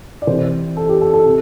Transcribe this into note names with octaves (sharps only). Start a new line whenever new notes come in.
D5
C3 E3 C5
A4
G4
A4
A4
C3